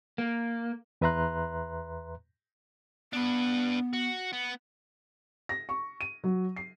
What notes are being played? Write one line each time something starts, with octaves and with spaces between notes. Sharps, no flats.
A#3
E2 B4 E5 A#5 C6 F#6
B3 D4 B4
F#4
B3
A#6
C#6
D#7
F#3
C7